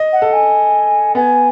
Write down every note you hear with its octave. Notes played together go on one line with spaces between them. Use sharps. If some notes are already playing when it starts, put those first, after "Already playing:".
Already playing: D#5
F#5
A4
G#5
B3 G#5